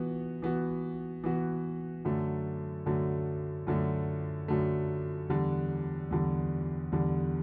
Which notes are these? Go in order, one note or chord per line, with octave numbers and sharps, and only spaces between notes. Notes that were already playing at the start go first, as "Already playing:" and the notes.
Already playing: E3 B3 F#4
E3 B3 F#4
E3 B3 F#4
F#2 D3 F#3 A3
F#2 D3 F#3 A3
F#2 D3 F#3 A3
F#2 D3 F#3 A3
E2 D3 G3
E2 D3 G3
E2 D3 G3